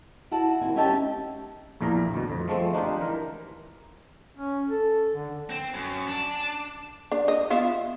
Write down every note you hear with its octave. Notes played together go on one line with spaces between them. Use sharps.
E4 F#4 F#5 A5
D#2 C4 G#5
C#4 D#4 G4 E5 G5 A5
A#1 E2 A#2 E3 A#4 A#5
D2 B2
F2
F3 G#3 A3 C4
G#3 D4 D#4 F4 G4
E3 A#4
C#4
A4
D3
C4
F#2
D4
D4
D#5
B3 F4 E5